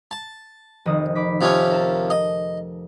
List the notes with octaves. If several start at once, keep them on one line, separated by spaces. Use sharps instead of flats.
A5
F1 D#3 D#6
B5 D6 B6
C3 F3 C#4
A#4 A5
D#5